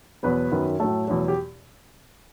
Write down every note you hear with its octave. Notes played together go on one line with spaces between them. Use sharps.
E2 B2 F#3 B3 B4
F#2 D#3 F#3
A2 F#3 A3 A4
E2 B2 F#3
G4